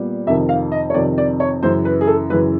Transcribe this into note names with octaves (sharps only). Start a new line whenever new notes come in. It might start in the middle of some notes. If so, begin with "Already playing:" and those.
Already playing: A#2 G3 B3
F2 C3 D#3 E5
F5
D#5
C#5
F2 C3 D#3 D5
D5
C#5
F#2 C#3 E3 C5
B4
G#4
A4
F#2 C#3 E3 B4